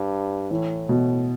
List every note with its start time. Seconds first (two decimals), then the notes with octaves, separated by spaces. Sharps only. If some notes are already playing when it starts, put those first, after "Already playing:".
Already playing: G2
0.51 A2 E3
0.89 B2